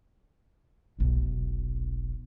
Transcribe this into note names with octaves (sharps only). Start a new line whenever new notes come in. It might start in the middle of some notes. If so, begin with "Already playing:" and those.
F1 B1